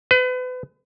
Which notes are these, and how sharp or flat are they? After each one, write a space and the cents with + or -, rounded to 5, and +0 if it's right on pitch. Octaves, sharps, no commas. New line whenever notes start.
B4 +35